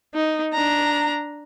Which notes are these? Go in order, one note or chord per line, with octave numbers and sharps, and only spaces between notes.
D#4
D4 A#5